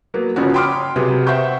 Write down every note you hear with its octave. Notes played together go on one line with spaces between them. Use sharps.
F#3 A#3 B3
G1 C#3 F3 C#4 F#4
G5 B5 C6 D6 D#6 F6
C3 F#3 B3 G#4
C5 E5 F#5 G5 C#6 G6